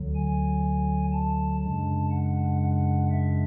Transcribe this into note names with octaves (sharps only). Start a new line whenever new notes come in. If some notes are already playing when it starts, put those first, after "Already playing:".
Already playing: D2 D3 F#3
G#5
A5
F#2 C#3 G#3 D4 A5
F#5
F#5
E5